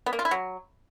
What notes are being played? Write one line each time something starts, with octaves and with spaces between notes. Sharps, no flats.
B3
A#3
F4
E4
F#3